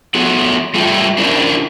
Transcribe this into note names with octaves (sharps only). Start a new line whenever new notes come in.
A3 B3 F#4 A4
G3 A3 F4 A4 G5
C#4 D4 E4 F4 A#4 C5